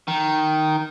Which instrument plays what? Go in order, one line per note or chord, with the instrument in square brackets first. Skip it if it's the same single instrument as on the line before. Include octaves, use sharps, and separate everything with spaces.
[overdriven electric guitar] D#3